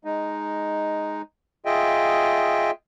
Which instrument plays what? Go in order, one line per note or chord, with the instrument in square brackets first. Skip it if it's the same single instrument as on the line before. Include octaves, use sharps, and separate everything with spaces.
[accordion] G#3 D#4
F4 G#4 D#5 E5 G5